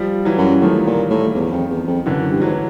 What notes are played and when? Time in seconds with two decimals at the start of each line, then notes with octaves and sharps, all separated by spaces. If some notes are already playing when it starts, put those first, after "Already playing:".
Already playing: F3 G3
0.25 E3 F#3
0.38 F#2
0.61 A2 D#3 F3
0.87 A#2
1.10 A2
1.35 E2
1.52 F2
1.70 E2
1.87 F2
2.05 F#2 D3 E3
2.19 F#2
2.31 G2
2.42 G#2 E3 F#3